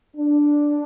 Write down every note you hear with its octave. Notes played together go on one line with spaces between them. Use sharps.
D4